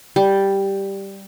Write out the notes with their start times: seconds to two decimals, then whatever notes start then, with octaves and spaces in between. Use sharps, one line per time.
0.16 G3